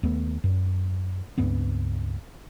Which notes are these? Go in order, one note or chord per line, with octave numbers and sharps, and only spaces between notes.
D#2 A3 B3
F#2
C#2 G2 B3 C4